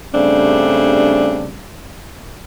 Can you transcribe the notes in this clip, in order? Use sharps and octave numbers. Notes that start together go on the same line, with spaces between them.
G2 C#3 G3 A3 C4 D4